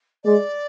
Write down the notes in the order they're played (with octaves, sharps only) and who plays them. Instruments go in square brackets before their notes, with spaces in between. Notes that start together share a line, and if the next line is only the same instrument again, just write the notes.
[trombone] G#3 [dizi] D5